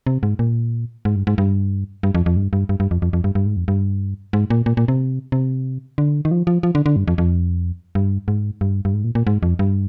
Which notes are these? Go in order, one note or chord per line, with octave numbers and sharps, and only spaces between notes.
C3
G#2
A#2
G#2
G2
G#2
G2
G2
F2
F2
G2
G2
G2
G2
F2
F2
F2
G2
G2
G#2
F2
G2
G#2
A#2
A#2
A#2
C3
C3
D3
D#3
F3
F3
F3
D3
D3
G2
F2
F2
G2
G#2
G2
G2
G#2
A#2
A#2
G#2
F2
G2